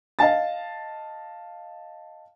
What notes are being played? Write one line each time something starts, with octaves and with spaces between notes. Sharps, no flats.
D#5 F5 A5 A6